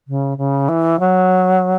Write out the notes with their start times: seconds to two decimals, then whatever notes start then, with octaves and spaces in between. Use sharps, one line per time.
0.07 C#3
0.37 C#3
0.68 E3
0.99 F#3